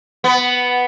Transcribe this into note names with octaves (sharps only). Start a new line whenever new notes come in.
B3